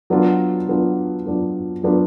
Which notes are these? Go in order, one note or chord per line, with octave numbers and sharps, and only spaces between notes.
F#3 B3 D4 F4
F#3 B3 D4 F4
F#3 B3 D4 F4
F#3 B3 D4 F4